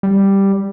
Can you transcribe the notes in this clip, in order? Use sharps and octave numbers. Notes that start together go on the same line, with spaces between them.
G3